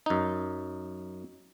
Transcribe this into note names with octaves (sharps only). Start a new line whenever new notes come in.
F#2 D#4